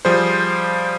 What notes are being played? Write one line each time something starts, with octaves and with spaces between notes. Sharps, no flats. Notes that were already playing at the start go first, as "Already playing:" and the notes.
F3 G3 G#4 C5